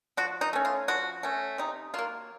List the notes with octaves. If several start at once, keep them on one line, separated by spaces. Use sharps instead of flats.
F3 F#4
D#4
A3 C#4
F4
F3 F#4
A3 C#4
C3 D#4
F#3 A#3 F4